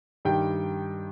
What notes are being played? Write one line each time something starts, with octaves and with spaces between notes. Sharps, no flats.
G2 D#3 G3 G5